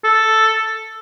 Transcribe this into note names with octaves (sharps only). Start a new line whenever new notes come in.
A4